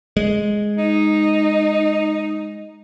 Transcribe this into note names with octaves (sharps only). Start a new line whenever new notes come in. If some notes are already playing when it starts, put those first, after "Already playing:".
G#3
D#4